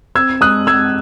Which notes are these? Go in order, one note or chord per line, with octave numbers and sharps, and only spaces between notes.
C4 E6 G#6
G#3 D#6 F#6
G#3 E6 G#6